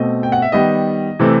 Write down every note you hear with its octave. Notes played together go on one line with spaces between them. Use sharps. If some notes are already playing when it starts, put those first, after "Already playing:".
Already playing: B2 A3 C4 D#5
G5
F#5
E5
D#3 G3 B3 D#5
C3 E3 A3 C4